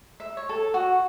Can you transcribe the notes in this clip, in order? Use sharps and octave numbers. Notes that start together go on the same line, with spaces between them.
E5
C#5
A4
F#4